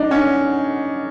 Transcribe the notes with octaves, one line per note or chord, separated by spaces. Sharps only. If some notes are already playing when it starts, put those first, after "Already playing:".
Already playing: D4 D#4
C#4